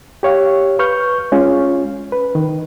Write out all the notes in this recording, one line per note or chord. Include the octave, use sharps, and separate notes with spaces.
G4 C#5 F5
B4 C#6 F6 G6
G#3 C#4 F4
B4
D#3